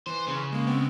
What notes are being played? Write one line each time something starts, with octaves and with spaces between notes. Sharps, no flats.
E3 C5
C#3
G#3 A#3
G#3 B3 C4